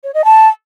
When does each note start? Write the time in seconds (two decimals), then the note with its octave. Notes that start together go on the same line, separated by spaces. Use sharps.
0.04 C#5
0.14 D#5
0.25 A5